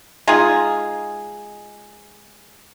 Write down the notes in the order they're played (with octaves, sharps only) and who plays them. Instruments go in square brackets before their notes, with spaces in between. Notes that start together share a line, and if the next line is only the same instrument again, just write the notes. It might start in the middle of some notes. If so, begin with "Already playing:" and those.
[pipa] G#3 D#4 F4 G#4